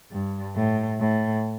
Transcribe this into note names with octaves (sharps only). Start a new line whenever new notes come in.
G2
A2
A2